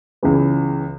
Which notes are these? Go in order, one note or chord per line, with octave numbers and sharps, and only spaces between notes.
C#2 C#3 E3 G#3 B3